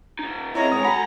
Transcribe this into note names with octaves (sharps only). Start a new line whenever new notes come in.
A#2 D#4
C4 E4 G#4 C#5 D#5 A#5
G#3 C#5 G5 G#5 D#6
C2 F#4 A4 F#5 G#5 B5